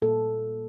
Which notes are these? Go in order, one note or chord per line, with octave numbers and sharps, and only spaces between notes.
A#2 G3 A#3 A4